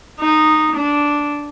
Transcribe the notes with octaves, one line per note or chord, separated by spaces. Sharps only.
D#4
D4